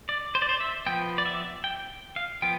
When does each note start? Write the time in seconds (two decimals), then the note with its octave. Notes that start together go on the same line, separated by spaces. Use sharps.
0.09 D5
0.35 C5
0.42 D5
0.49 C5
0.60 E5
0.86 F3 B3 G5
1.18 D5
1.25 E5
1.64 G5
2.16 F5
2.42 F3 B3 G5